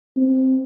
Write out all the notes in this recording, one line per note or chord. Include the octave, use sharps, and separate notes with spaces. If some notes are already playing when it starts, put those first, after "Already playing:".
C4